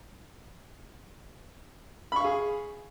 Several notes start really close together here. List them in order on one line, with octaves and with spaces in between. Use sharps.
B5 C#6 F5 G#4